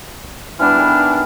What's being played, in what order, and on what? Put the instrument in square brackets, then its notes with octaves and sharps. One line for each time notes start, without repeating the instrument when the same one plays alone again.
[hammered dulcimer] E3 G3 B3 [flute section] D4 F6
[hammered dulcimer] D#3 G#4